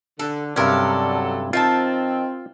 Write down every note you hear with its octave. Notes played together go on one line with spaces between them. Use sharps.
D3 A4
G2 C3 F#3 C#4 D4 A4 A#4
D#3 C4 F4 E5 A5